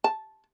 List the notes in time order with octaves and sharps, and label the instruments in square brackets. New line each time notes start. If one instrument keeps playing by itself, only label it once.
[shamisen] A5